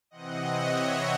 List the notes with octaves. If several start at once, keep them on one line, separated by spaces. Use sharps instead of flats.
C3 E3 C4 D#5 F#5
C#5 E5